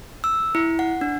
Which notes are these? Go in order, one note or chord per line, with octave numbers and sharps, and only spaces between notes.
E6
E4
F#5
D4